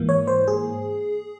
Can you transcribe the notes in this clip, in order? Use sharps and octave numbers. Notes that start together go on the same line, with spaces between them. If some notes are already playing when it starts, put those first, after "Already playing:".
Already playing: G#2 E3 A#3
C#5
C5
G#4